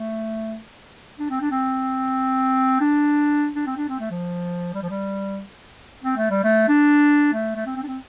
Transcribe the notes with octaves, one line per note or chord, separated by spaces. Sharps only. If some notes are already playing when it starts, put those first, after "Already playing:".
Already playing: A3
D4
C4
D4
C4
D4
D4
C4
D4
C4
A3
F3
G3
F3
G3
C4
A3
G3
A3
D4
A3
A3
C4
C4
D4
C4